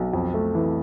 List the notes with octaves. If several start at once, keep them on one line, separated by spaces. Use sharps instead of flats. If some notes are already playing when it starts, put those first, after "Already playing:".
Already playing: B1
F2
A3
E3